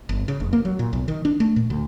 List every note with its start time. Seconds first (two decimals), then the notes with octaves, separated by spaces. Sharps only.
0.09 G1
0.28 C#3
0.40 F1
0.53 A#3
0.65 F#3
0.79 A#2
0.93 B1
1.08 D#3
1.25 D4
1.40 A3
1.56 A#2
1.70 D2